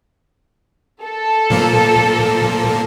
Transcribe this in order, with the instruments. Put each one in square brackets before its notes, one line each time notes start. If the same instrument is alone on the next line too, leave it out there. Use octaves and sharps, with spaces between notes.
[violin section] A4
[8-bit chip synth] A#2 F3 A#3